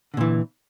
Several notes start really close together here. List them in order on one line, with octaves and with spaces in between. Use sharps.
D3 A#2 E3